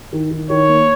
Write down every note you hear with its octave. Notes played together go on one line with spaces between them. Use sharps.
D#3
D#3
D#3 C#5
A#3